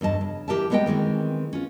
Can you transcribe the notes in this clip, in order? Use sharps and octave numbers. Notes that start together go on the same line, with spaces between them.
E2 G2 D#5 A5
C#3
E3 G#3 G4 A#4 E5 A5
G3 G#3 B3 C5 D#5 G5
D#3 E3 G#3 C4
C#4 F4